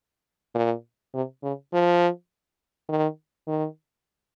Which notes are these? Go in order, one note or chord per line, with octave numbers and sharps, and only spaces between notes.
A#2
C3
C#3
F3
D#3
D#3